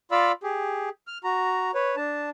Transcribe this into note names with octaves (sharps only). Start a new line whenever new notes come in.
F4 D5 F5 B5 E6
G4 G#4
F6
F#4 A#5
B4 C#5
D4 A5